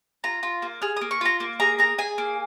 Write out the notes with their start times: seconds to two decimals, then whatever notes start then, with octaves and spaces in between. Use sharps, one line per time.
0.24 F4 A#5
0.43 F4
0.62 A#3
0.82 G#4 F6
0.97 A#3 D#6
1.11 C#6
1.21 F4 A#5
1.40 A#3
1.60 G#4 A#5
1.79 G#4 A#5
1.98 G#4 G#5
2.18 A#3